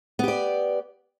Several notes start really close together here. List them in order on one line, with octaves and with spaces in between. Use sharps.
B3 G4 D5